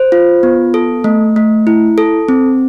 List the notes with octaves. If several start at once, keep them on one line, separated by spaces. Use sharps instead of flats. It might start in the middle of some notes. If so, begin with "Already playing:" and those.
Already playing: C5
F4
B3
A4
A3
A3
E4
A4
C4